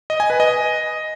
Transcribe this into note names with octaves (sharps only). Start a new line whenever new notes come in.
D#5
G#5
B4
D#5